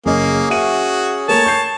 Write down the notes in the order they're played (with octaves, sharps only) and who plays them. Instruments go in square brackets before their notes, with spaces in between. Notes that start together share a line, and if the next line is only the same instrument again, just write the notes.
[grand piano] F#1 D#5 [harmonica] A#3 [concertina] C#4 G#4
[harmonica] F#4 [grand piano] E5 D#7
[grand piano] A3 A#3 A#4 [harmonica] C#5 A5
[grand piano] G6 C7